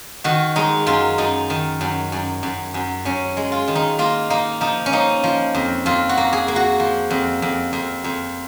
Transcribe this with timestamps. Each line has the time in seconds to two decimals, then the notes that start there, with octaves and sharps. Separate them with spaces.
0.24 D#3 F#4
0.56 G#3 D#4
0.87 F#2 F4
1.18 F#2 D#4
1.50 D#3
1.81 F#2
2.12 F#2
2.43 F#2
2.74 F#2
3.05 F#2 C#4
3.37 G#3
3.52 F4
3.68 D#3
3.75 D#4
3.99 A#3 F4
4.30 A#3 D#4
4.61 F3 D#4
4.86 C#4
4.93 A#3 D#4
5.24 F3
5.55 F2
5.86 F2 F4
6.09 F#4
6.17 A#3
6.33 G#4
6.48 A#3
6.56 F#4
6.80 F3
7.10 F2
7.42 F2
7.73 F2
8.04 F2